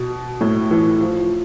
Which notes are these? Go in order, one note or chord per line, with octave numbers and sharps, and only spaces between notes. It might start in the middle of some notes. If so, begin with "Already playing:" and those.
Already playing: B2
A2
E3
F3